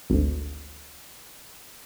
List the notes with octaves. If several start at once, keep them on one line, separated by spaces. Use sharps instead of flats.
G#1 D2